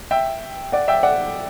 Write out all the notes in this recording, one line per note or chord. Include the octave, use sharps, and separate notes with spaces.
E5 G5
D5 F#5
E5 G5
D5 F#5